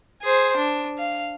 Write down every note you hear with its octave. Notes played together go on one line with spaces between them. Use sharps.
G#4 C5
D4
F5